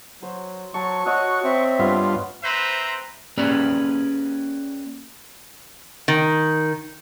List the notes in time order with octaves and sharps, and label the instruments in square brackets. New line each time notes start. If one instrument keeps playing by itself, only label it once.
[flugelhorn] F#3 [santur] C5
[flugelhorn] F#3 [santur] A5 [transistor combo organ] C#6
[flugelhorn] F#4 [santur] C#5 D#5 E6 [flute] F#6
[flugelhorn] C4 [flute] E5
[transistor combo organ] G2 F4 [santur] B3
[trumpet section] C4 B4 C5 E5 A#5
[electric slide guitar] A#3 C#4 G4 G#4 B4 D5
[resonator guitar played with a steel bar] D#3